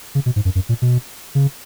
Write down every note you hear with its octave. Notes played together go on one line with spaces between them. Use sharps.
C#3
B2
G#2
F#2
F#2
A#2
B2
C#3